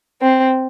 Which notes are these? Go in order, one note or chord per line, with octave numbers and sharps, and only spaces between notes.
C4